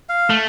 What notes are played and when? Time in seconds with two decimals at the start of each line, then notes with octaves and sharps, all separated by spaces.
0.09 F5
0.30 A3